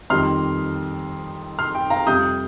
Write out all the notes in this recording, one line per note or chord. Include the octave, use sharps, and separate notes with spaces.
F2 D#3 G3 D#4 C6 F6
C6 F6
G5
F5 A#5
F2 C3 G3 D#6 G6